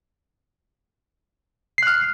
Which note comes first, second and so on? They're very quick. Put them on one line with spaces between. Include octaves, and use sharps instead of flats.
C7 F#6 F6